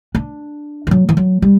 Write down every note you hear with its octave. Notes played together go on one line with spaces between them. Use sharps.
D4
E3
F#3
E3
F#3
G3